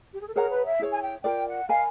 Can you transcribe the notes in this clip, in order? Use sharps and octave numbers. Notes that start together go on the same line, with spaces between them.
G4
G#4
A4
G#4 A#4 C#5 F#5 A#5
B4
E5
E4 G#4 C#5
G#5
G5
F4 A#4 D5 G5
F#5
A#4 D#5 F5 G#5 B5